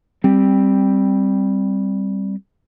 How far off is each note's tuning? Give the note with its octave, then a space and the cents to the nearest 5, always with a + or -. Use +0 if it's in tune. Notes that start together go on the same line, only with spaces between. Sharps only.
G3 +0 C4 +10